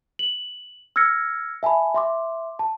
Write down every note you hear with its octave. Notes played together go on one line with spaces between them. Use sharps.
F#7
E6 F6 G#6 A#6 C#7
E5 G#5 A5 B5
E5 C6 D6
A5